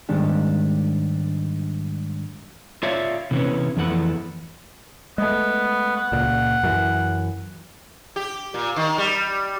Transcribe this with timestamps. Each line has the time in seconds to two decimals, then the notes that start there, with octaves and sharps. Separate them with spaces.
0.09 G#2 D#3 G3 G#3 D4 G4
2.83 F4 C#5 D5 E5 F5
3.31 C3 E3 G#3 A3 B3 C#4
3.77 F2 E3 A3 E4 F#5
5.18 G#3 A3 B3
5.96 F#5
6.12 C#2 A#2
6.63 F#2 E3
8.16 G4
8.54 A#2
8.76 D#3
8.98 G3